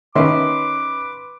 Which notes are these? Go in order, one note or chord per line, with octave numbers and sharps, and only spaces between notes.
D#3 C#4 B4 E5 C6 D6